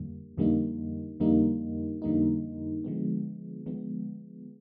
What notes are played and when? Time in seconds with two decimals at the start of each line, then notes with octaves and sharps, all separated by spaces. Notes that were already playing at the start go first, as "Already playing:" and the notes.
Already playing: F2 D3 G3 A#3
0.38 F2 D3 G3 A#3 D#4
1.20 F2 D3 G3 A#3 D#4
2.02 F2 D3 G3 A#3 D#4
2.84 D3 F3 G#3 B3
3.66 D3 F3 G#3 B3